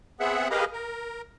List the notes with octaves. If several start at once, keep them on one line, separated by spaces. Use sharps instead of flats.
B3 C4 G#4 E5 F#5
G4 G#4 A#4 B4 D#5 F5
A#4